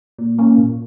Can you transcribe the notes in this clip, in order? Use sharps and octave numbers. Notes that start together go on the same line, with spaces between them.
A#2
A#3 C#4
A#2